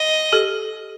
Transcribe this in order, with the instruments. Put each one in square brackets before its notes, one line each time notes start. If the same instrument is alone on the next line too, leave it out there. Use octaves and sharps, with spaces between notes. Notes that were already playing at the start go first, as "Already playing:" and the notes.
Already playing: [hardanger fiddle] D#5
[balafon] G4 A4